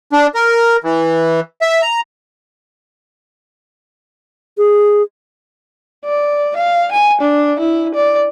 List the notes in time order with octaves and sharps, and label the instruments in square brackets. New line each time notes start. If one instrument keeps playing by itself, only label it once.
[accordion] D4
A#4
E3
E5
A#5
[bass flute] G#4
[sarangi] D5
F5
G#5
D4
E4
D5